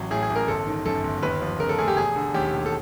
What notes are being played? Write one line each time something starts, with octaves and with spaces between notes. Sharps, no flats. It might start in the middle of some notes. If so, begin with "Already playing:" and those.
Already playing: A1 F#3
A2 G#4
G#4
A1
A#4
G1 A4
D#3
F#2 A4
G1
D#2 B4
F3
C#3 A#4
A4
A3 G#4
G4
E1 G#4
D3
D#2 G4
E1
A4